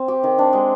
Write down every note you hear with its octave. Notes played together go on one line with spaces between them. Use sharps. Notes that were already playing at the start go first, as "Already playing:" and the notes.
Already playing: C4
G4
D#3
D4
G#3